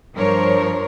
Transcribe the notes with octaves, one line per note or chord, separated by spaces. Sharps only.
G2 F3 D4 A#4 C5 C#5